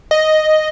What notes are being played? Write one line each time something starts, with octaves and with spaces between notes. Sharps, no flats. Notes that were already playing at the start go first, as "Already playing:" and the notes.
D#5